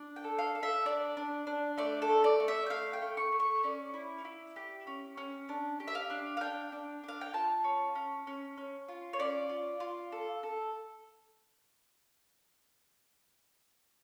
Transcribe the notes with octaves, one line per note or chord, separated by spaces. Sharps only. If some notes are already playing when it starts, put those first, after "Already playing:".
Already playing: D4
G5
A4
F5
A4
E5
D4 D5
D4
D4
A3 D5
A4
A3
D5
A3
E5
G5
A3 F5
G5
A3
C#6
A3
C#6
C#4 D5
E4
E4
G4
C#4
C#4
D4
G4
E5
F5
D4
F5
D4 G5
D4
D4 F5
G5
F4 A5
C#4
C#4
C#4
C#4
F4
C#5
C#4 D5
F4
F4
A4
A4